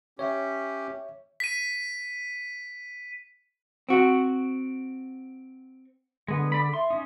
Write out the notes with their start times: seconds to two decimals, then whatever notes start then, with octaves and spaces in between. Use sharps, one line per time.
0.19 C#4 G4 C#5 E5
1.40 B6 D#7
3.89 C4 F#4
6.28 D3 G#3 B3
6.52 D5 B5
6.74 E5 C6
6.90 C#4 D#4